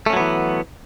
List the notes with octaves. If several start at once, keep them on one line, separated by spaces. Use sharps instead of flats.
E3 F#3 A3 B3 C#4